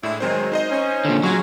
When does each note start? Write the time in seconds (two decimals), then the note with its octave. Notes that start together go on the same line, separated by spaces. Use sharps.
0.03 A2 G#3 D4 E4
0.20 D#3 F#3 G#3 C4 C5
0.52 D#4 C5 D#5
0.70 C#4
1.05 A#2 D3
1.23 F#3 G#3 F4 G#4 C#6